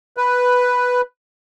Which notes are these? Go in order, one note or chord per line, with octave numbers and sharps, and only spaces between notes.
B4